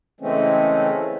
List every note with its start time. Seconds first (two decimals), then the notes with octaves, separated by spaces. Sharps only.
0.21 C#3 E3 G#3 A3 C4 C#4